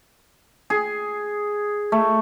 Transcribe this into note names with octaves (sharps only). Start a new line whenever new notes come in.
G#4
A3